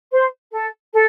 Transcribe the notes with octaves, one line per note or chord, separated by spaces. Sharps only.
C5
A4
A4